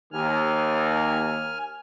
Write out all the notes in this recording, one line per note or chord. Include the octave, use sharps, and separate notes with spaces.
D#2 G#5 F6